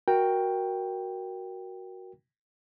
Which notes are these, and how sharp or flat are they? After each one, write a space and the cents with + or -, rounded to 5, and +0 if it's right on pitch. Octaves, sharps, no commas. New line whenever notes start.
F#4 +0 A#4 +15 G5 +5